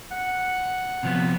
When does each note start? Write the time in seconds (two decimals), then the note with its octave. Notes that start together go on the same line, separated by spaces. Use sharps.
0.11 F#5
1.03 C3 F3 B3